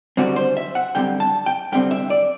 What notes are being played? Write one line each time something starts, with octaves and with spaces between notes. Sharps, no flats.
F#2 D3 G3 C4 F#4
C5
E5
F#5
F#2 D3 G3 C4 G5
A5
G5
F#2 D3 G3 C4 G5
E5
D5